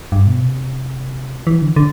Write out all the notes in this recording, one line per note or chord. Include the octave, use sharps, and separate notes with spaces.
G2
B2
C3
E3
D3
D3